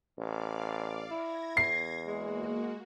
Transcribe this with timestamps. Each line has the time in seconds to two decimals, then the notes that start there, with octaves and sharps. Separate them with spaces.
0.18 A1 D5 F5 D6
1.11 E4 G#6 A#6
1.57 E2 C7
2.07 G#3 A#3 F#4